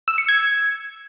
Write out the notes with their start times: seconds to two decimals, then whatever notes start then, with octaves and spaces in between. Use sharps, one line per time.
0.08 E6
0.18 C#7
0.28 G#6